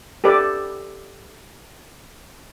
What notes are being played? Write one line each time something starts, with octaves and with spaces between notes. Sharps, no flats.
G4 A4 B4 D5